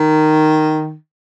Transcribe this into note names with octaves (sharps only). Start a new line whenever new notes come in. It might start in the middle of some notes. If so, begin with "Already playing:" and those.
Already playing: D#3